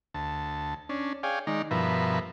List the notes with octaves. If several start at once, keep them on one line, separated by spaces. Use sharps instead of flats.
D2 A5
C#4 D4
G#4 C#5 D5 F5 G5 G#5
D#3 G#3 D#4 D5
G2 B2 F3 A#4 B4 E5